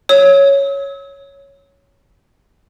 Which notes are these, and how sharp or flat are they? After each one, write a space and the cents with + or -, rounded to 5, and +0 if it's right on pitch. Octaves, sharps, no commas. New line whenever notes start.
C#5 +0 E6 -40